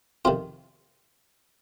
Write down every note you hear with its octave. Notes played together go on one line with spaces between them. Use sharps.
F2 C3 D#3 F4